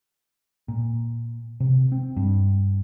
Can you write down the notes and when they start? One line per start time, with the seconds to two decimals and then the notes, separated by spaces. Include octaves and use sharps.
0.68 A#2
1.60 C3
1.92 C4
2.17 G2